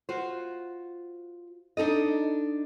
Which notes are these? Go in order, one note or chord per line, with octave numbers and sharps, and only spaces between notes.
F4 F#4 C5
D4 D#4 A4 D#5